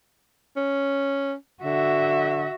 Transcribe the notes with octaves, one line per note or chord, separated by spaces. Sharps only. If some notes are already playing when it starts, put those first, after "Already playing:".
C#4
D3 F#4 E5